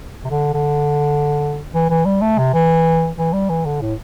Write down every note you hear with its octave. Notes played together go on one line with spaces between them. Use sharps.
C3
D3
D3
E3
E3
G3
A3
C3
E3
E3
G3
E3
D3
A2